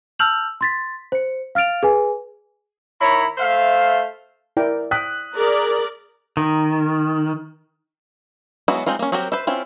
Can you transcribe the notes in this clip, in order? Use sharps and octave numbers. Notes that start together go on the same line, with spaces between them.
A5 E6 F6 G6 F7 F#7
C6 A6 B6
C5 C#7
F5 F6 A6 D7 F7
G#4 B4 G#5
D#3 E4 C#5 A#5 B5
A3 C5 E5 F5
E4 A#4 D5 G5
G5 D#6 F#6 B6
G#4 A#4 D5
D#3
F#3 G#3 B3 E4 F#4
G#3 C4 D#4 F4
A#3 C#4
F#3 C4 F#4 G4 A#4
B4 C5 E5
C4 C#4 E4 F4